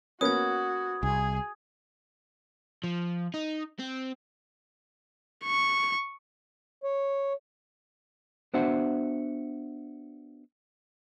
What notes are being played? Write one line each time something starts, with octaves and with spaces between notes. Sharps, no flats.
A#3 B3 C#4 F#4 D#6 G#6
C2 G#4
F3
D#4
C4
C#6
C#5
B3 D4 F#4 C5 E5 F#5